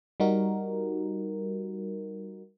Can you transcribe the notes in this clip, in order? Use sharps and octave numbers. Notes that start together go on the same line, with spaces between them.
G3 D#4 F#4 A#4